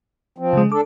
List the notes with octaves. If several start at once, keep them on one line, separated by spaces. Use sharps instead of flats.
F3 C4
C#3 G#3
D4 A4 D6